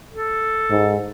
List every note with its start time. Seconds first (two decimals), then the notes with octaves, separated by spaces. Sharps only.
0.13 A4
0.70 G#2